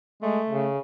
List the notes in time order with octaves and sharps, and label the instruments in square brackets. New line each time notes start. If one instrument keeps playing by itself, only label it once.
[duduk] G#3 [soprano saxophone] A3
[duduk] C#3